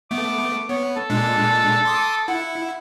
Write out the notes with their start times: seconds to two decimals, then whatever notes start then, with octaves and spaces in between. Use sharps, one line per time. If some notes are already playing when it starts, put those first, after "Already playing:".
0.11 A3 B3 D6
0.69 B3 C#5
0.96 A4
1.10 A#2 G#3 D4
1.85 C6 D6 D#6
2.28 E4 F#5